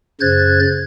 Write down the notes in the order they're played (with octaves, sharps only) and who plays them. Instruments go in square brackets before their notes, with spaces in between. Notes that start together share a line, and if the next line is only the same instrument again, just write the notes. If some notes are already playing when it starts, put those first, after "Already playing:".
[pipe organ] F#2 C#3 C5 F#6 G#6 A6